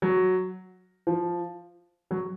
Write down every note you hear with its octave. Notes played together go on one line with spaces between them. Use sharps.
F#3
F3
F#3